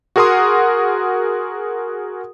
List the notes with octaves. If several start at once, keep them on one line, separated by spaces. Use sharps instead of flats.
F#4 G#4 A#4 F#5 C6 D#6